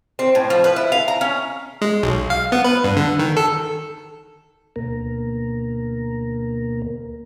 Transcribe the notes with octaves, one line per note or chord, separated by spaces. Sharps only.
C4
A2
F3
B4
E4
F5
A#5
C#4
G#3
B1
F5
B3
B4
G2
D3
D#3
A4
D2 B2 A#3 A#4